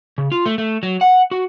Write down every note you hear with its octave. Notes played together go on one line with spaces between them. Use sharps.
C#3
F4
A3
A3
F#3
F#5
F#4